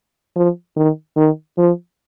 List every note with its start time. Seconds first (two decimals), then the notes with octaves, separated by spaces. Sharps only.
0.36 F3
0.77 D#3
1.17 D#3
1.58 F3